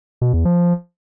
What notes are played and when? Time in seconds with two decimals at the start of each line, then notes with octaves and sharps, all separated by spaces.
0.21 B2
0.33 E2
0.45 F3